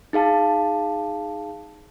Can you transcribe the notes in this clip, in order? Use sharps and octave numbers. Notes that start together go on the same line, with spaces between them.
D#4 G#4 F5 A5